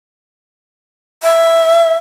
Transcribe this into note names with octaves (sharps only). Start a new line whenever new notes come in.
E5